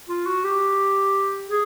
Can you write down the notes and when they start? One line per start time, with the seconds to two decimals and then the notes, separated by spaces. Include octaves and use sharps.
0.09 F4
0.27 F#4
0.45 G4
1.49 G#4